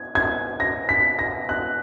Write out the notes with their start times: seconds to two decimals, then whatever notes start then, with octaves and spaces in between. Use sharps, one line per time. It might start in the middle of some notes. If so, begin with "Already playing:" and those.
Already playing: G#6
0.15 G#6
0.60 A#6
0.89 B6
1.19 A#6
1.49 F#6